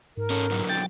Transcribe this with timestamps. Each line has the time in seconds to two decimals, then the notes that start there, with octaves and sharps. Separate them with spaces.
0.17 G#2 A#4
0.30 C#4 A4
0.50 B2 D3 F#3
0.69 G5 A6